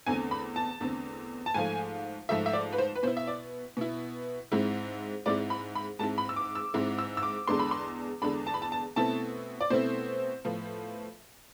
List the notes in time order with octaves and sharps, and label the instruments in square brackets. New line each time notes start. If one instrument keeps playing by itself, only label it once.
[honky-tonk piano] E2 D3 A3 C4 G#5
B5
A5
E2 D3 A3 C4
A5
G#2 F3 A3 G#5
G#2 F3 A3 E5
E5
D5
B4
C5
B4
B2 B3 E4 C5
E5
D5
B2 B3 E4
G#2 G#3 C4 E4
G#2 G#3 C4 E4 D5
B5
B5
G#2 G#3 C4 E4 A5
B5
E6
D6
E6
G#2 G#3 C4 E4
E6
E6
D6
E2 D3 G#3 D4 C6
B5
C6
E2 D3 G#3 D4 B5
A5
B5
A5
A5
B2 A3 C4 E4 A5
D5
B2 A3 C4 E4 C5
A2 F3 B3